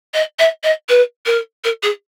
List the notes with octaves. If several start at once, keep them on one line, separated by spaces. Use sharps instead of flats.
D#5
E5
D#5
B4
A#4
A#4
G#4